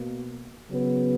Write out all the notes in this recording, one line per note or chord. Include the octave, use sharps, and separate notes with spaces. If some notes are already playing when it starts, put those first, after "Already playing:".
Already playing: B2 A#3
C#3 F#3 B3